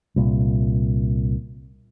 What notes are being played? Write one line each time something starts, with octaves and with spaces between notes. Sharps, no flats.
C2 A#2